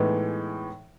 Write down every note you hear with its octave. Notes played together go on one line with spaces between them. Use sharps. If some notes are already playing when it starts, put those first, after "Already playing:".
Already playing: A2 E3 G#3 B3 D#4